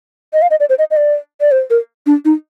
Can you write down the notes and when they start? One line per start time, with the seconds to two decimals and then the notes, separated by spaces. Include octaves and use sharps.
0.33 D#5
0.42 F5
0.51 D#5
0.60 D5
0.69 C5
0.79 D#5
0.91 D#5
0.97 D5
1.41 D5
1.52 C5
1.70 A#4
2.06 D4
2.25 D#4